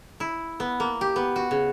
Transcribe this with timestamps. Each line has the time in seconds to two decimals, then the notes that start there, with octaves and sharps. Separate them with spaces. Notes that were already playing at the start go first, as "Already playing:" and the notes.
0.20 E4
0.60 B3
0.80 A#3
1.01 G4
1.16 B3
1.36 F#4
1.51 C#3